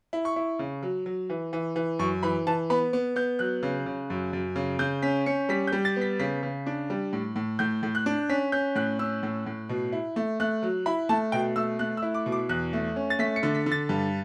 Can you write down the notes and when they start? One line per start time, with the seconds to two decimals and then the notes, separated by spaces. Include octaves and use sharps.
0.13 E4
0.25 C#6
0.36 E4
0.59 C#3
0.83 F#3
1.06 F#3
1.30 E3
1.53 E3
1.76 E3
1.99 F#2 C#6
2.23 E3 B5
2.47 E3 A5
2.70 B3 B5
2.93 B3
3.16 B3 G6
3.39 F#3 F#6
3.63 C#3
3.86 C#3
4.10 F#2
4.33 F#2
4.56 C#3
4.79 C#3 G6
5.02 C#4 B6
5.26 C#4 C#7
5.49 G3 B6
5.67 G6
5.72 G3
5.85 A6
5.96 B3
6.01 B6
6.19 C#3 B6
6.43 C#3
6.66 D4
6.90 G3
7.13 A2
7.36 A2
7.59 A2 G6
7.83 A2
7.95 F#6
8.06 D4
8.29 C#4 B6
8.52 C#4 G6
8.75 A2 F#6
8.99 C#4 E6
9.23 A2
9.46 A2
9.69 B2
9.92 E4
10.16 A3
10.40 A3 F#6
10.63 F#3
10.86 E4 B5
11.09 A3 A5
11.32 B2 G5
11.56 A3 E6
11.79 A3 F#6
11.97 E6
12.02 E4
12.14 D6
12.26 B2
12.32 D6
12.49 E2 F#6
12.73 A3
12.96 C#4
13.10 A6
13.19 A3 B6
13.36 C#7
13.43 D3
13.55 B6
13.66 D3
13.72 A6
13.89 G2